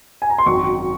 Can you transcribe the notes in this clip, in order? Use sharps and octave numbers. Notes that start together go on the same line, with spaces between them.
G#5
A#5
C6
G#1 F#2 D#3 C#6